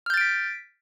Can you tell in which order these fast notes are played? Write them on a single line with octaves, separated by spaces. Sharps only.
F6 G6 A6 D7 B6